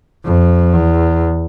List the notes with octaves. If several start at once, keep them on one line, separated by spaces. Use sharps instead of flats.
F2
E2